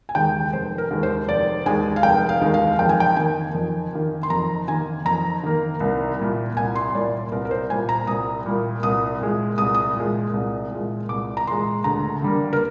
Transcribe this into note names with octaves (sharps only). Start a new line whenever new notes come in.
G#5
D#2 D#3 G#3 G5
F1 C5
A#4
D#2 D#3 G#3
C5
F1 D5
D#2 D#3 G#3 G#5
F5
F1 G5
F5
D#2 D#3 G#3
F5
F2 G5
G#5
G5
D#3 A#3 G#5
F2
D#3 A#3
C6
F2 A#5
D#3 A#3 G#5
F2 A#5
D#3 A#3
C2
A#2 G3 A#3
C2 G#5
C6
A#2 G3 A#3 D5
C2 A#4
A#4
C5
A#2 G3 A#3 G#5
A#5
C2 D#6
A#2 G3 A#3
C2 D#6
A#2 G#3
C2 D#6
D#6
A#2 G#3
C2
A#2 G#3
C2 D6
A#5
A#2 G#3 C6
D2 A#5
D3 G3 A#3
A#4